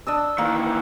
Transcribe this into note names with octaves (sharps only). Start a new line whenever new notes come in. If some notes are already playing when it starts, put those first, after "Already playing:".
D4 D#5 E6
D#3 E3 A#3